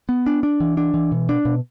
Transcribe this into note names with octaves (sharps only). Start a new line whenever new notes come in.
B3
D4
D4
E3
D4
E3
B2
D4
B2